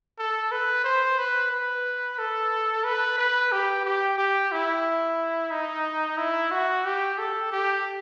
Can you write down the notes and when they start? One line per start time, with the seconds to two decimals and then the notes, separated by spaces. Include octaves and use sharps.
0.19 A4
0.51 B4
0.84 C5
1.18 B4
1.51 B4
2.18 A4
2.84 B4
3.18 B4
3.52 G4
3.85 G4
4.18 G4
4.52 E4
5.51 D#4
6.18 E4
6.51 F#4
6.84 G4
7.18 A4
7.52 G4